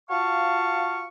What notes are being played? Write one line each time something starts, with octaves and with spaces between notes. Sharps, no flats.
F4 F#4 F5 A5 C#6